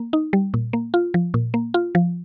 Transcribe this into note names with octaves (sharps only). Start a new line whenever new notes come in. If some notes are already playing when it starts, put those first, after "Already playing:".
Already playing: A#3
D#4
G3
A#2
A#3
F4
F3
A#2
A#3
F4
F3